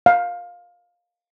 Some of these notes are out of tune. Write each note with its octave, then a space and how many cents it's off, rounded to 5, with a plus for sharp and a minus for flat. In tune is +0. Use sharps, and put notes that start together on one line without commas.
F5 +15